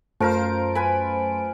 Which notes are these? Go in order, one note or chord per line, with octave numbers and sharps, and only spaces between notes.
F#2 A3 F4 A#4 C5 F5 D7
B4 G#5 B5